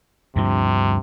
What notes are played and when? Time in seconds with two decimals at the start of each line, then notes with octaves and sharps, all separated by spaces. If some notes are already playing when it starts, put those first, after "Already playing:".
0.36 D2 G2 C3 F3